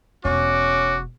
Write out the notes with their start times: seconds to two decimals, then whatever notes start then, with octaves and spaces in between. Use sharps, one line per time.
0.25 E1 C#4 F#4 D6